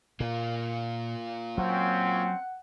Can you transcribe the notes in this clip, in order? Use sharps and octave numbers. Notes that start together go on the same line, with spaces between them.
A#2 A#3 F4
F#3 C4 C#4 F#5